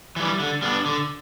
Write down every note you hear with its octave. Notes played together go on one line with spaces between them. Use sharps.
E3 G3
D3
G3 B3 D4
D3